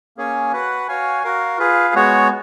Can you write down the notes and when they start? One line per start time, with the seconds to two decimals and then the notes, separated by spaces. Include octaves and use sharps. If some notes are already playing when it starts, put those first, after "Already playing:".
0.17 A#3 C#4 G#4 C#5 G#5
0.52 F#4 B4 F#5
0.88 F#4 C#5 F5 G#5
1.23 F#4 A#4 F5
1.58 F4 G#4 B4 F5
1.95 G#3 B3 F#4 C#5